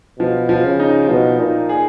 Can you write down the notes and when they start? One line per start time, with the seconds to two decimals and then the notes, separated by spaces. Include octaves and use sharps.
0.19 B2 F3
0.49 F3
0.64 C#3
0.79 D#4
1.09 B2 F3
1.39 A#2 D#4
1.69 G#4